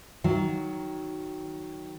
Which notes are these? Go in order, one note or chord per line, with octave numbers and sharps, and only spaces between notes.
D#3 F#3